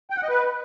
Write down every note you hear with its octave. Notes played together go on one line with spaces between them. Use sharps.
G5
F#5
D#5
B4